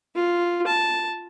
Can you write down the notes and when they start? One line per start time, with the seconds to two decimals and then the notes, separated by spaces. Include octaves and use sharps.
0.15 F4
0.67 A5